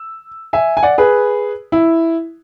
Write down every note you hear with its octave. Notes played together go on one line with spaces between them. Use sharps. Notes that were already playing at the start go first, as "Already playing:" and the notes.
Already playing: E6
E5 G#5
G#5
D5 F#5
G#4 B4
E4